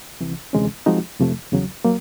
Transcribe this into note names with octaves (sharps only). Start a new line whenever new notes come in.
C2 C3 E3
D2 C3 E3 G#3 C#4
F3 G#3 C4 D#4 F#4
F2 C3 F3 A3
E2 C#3 F#3
F#3 A#3